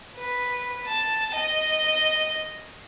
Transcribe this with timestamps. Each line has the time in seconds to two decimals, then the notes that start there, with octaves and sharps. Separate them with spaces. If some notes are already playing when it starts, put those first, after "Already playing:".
0.17 B4
0.87 A5
1.35 D#5